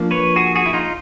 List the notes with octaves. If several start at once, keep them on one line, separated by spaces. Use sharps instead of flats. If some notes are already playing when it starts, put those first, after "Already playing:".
Already playing: F3 A#3 D4
B4 C#5
F#4 G#4
F#4 G#4
E4
D#4 F4